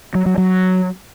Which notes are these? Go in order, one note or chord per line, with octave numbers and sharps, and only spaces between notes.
F#3
F#3
F#3